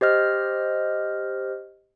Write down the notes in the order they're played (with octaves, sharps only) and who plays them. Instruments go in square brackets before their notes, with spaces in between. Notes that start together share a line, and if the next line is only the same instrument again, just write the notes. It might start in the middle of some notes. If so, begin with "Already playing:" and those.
[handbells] G4 C5 D#5 F6